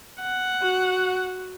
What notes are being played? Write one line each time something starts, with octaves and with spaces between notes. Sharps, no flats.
F#5
F#4